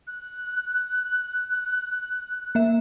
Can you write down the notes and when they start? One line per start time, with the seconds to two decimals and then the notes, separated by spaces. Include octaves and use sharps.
0.07 F#6
2.55 A#3 E5